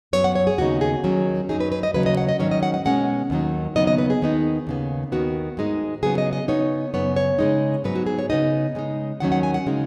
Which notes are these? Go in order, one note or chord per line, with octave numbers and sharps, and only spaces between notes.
F#2 F#3 B3 C#5
F#5
C#5
G#4
D#2 C#3 B3 D#4 F#4
G#4
D#2 D#3 F#3 C#4
F#2 F#3 D#4 G#4
B4
B4
D#5
D#2 C#3 F#3 B4
D#5
F#5
D#5
G#2 D#3 F#3 C#4 C#5
D#5
F#5
F#5
B2 G#3 C#4 F#5
D#2 D#3 F#3 D#4
D#2 C#3 F#3 B3 D#4 D#5
D#5
B4
G#4
D#2 D#3 B3 D#4
D#2 C#3 B3
D#2 D#3 B3 F#4
G#2 G#3 D#4
C#3 F#3 B3 G#4
D#5
D#5
C#3 B3 D#4 C#5
F#2 C#3 B3 C#5
C#5
C#3 G#3 D#4
G#2 F#3 B3 D#4 B4
F#4
G#4
C#5
C#3 B3 D#4 D#5
C#3 G#3 D#4
D#2 D#3 F#3 C#4 F#5
F#5
G#5
F#5
C#3 G#3 D#4